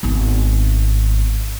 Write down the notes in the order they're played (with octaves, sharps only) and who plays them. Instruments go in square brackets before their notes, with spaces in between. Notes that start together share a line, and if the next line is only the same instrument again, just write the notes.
[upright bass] G#1 B3